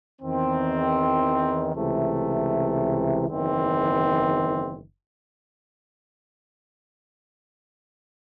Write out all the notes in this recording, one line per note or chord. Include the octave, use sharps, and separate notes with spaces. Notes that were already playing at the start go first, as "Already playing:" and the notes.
E2 D#3 C4
C#2 C3 E3 A3
F#1 E2 D#3 C4